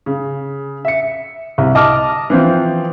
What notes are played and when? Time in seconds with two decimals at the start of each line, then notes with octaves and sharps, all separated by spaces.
0.06 C#3
0.85 E5 C#7
1.58 C2
1.75 D#5 A5 D6 F6
2.30 E3 F3 C4